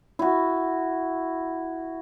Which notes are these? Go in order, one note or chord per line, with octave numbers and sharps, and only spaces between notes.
E4 F#4